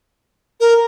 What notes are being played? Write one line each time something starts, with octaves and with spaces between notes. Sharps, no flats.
A#4